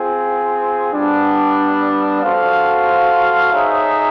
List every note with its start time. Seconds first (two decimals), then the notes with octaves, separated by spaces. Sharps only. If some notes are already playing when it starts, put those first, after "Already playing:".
Already playing: C4 F4 G#4
0.92 G3 B3 D4
2.22 F#4 A4 C5 F5
3.52 D#4 G#4 C#5 E5